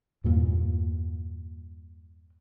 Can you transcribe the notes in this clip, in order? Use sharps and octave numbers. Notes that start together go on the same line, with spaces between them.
E2 G2 A#2 A#3